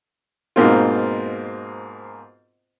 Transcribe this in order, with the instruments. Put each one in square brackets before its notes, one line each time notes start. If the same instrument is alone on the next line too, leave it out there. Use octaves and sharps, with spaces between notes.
[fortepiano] G#2 B2 A#3 C4 F4